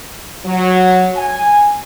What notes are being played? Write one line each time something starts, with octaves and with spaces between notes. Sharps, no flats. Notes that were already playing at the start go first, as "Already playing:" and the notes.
F#3
G#5